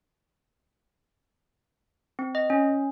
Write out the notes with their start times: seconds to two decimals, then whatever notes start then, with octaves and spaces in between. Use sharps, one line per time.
2.19 C4
2.35 D#5
2.50 C#4